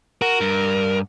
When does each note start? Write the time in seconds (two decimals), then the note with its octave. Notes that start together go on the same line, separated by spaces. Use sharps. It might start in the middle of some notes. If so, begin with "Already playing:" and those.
0.22 F#4 A#4
0.41 G2